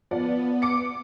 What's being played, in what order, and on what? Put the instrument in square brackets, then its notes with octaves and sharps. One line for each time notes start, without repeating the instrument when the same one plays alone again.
[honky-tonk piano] F3 D5 F#5 [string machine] B3
[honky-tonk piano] D6 C#7